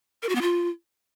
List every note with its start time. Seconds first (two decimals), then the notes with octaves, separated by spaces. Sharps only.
0.23 A#4
0.29 F#4
0.35 B3
0.42 F4